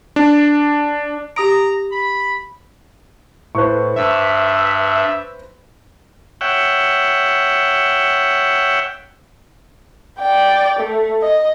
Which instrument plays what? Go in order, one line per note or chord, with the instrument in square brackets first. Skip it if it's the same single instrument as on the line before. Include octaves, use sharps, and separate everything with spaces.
[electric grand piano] D4
[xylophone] G4 D#6 D7 [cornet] A#5
[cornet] B5
[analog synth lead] A2 [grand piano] B4 C5 C#6
[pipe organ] G2 [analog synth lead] E5
[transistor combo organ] C#5 E5 F#5 G5
[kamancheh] D5 G5
A3
D#5